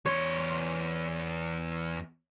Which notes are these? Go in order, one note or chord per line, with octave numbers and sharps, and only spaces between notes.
E2 C#5 C6